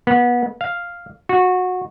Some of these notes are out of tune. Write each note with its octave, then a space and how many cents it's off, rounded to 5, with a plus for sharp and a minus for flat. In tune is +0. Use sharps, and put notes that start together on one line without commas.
B3 -25
F5 +0
F#4 -20